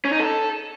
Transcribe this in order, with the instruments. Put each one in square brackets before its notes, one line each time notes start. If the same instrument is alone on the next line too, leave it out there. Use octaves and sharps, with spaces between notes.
[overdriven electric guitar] C#4
D#4
A4